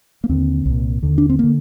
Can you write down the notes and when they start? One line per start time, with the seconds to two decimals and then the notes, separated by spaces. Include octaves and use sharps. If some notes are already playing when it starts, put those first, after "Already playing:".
0.24 A#3
0.29 D#2 D3 C4
0.66 C2 A#2
1.02 D#2 D3
1.18 D4
1.30 C4
1.39 D3 A#3